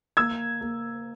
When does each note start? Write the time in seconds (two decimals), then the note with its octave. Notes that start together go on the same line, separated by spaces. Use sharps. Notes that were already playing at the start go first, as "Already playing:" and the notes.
0.17 A#3 E6 G#6
0.61 A#3